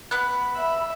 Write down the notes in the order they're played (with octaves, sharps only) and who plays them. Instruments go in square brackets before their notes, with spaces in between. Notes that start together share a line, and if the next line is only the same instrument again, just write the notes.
[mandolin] B3 F#6 [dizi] B5
[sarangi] E5